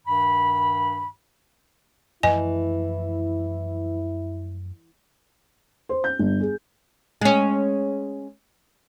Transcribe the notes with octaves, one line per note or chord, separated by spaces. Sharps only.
G2 D#3 B5
F#2 E3 F3 A3 E4 D#5 G#5
C5
G6
G1
G#4
G#3 C#4